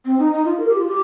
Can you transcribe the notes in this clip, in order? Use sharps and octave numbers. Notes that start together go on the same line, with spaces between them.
C4
D#4
D#4
F4
A#4
G4
F4
G4